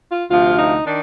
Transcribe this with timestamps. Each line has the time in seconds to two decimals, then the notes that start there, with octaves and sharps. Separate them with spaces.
0.12 F4
0.31 D2 C3 F3 F4
0.59 D#4
0.87 D#3 D4